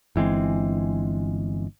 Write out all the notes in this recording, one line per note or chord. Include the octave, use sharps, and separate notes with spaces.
G1 E3 G#3 C4